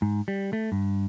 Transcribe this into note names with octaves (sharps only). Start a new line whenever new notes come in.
G#2
G3
A3
G2